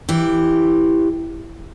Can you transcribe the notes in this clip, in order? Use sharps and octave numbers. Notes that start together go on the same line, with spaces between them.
E3 G4